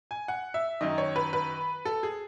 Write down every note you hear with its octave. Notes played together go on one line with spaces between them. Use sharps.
G#5
F#5
E5
F#2 D#3 D#5
C#5
B4
B4
A4
G#4